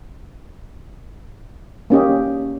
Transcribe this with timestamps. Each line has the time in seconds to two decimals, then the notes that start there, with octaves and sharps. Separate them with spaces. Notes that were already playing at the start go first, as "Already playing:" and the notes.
1.90 A#3 C#4 G4 D#5